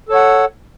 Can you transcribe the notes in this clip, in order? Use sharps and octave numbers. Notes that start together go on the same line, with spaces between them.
A4 C#5 F#5